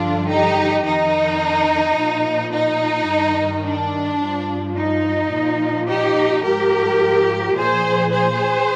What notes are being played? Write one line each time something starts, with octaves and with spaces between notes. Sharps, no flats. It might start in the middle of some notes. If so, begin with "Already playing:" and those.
Already playing: G2 D3 F3 D4 F4
D#4 G4
F2 D#3 D#4
A#2 F3
D#4
G2
D#3
D4
G2 F3
D#4
A#2 F3
D#4 G4
G#2 F3 G4 A#4
A#2 F3 G#4 C5
G#4 C5